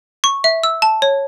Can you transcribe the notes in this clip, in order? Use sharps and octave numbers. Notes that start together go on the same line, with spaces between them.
C#6
E5
E6
A5
C#5